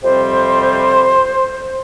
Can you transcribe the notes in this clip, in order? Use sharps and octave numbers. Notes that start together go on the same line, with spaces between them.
F2 C3 G3 C4 C5